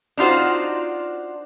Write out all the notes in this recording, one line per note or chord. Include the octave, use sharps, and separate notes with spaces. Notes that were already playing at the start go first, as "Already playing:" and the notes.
D4 D#4 F4 F#4 C5